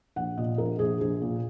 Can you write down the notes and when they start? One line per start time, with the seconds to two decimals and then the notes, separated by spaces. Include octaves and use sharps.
0.16 A#1 F#5
0.37 A#2 D#5
0.58 A#1 A#4
0.79 A#1 G#4
1.01 A#1 G#4
1.22 A#2